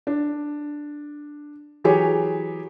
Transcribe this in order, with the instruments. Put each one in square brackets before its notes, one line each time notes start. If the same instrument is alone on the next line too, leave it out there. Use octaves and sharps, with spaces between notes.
[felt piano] D4
E3 F#3 G4 G#4 C#5